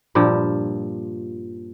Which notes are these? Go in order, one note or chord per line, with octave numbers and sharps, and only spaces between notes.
G2 A#2 F3